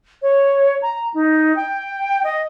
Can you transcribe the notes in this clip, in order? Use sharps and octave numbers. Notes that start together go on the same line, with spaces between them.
C#5
A#5
D#4
G5
D#5